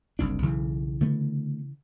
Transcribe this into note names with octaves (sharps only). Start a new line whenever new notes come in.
F#1 C2 D4
B1 C#3 E3
D3 A3 B3